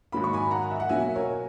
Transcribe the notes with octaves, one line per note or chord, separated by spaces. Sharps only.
G#2 D#3 F#3 A#3 B5
C#6
G#5 B5
F#5 A#5
E5
F#5
B2 F#3 A#3 E5 G#5
A#4 C#5